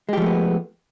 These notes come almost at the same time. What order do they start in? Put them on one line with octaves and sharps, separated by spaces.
G#3 G4 F3 A3 B3